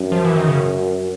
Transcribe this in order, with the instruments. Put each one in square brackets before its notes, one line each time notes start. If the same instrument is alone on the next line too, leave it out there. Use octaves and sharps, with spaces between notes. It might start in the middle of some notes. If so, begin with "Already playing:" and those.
Already playing: [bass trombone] F#2
[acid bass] F3
E3
D#3
C#3